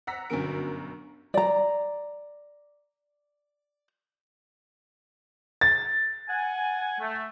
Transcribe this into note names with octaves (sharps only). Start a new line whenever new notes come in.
F#5 A#5 E6 A#6 B6
G1 F#2 B2 D3 A#4 D7
D5 A#5
A6
F#5 G#5
A3